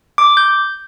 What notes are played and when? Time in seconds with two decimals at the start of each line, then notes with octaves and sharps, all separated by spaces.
0.18 D6
0.37 G6